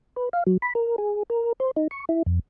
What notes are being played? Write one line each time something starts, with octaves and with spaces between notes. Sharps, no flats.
B4
F5
F#3
B5
A#4
G#4
A#4
C5
D#4
C#6
E4
F2